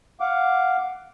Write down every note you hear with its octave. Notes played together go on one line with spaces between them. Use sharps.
F5 F#5 D6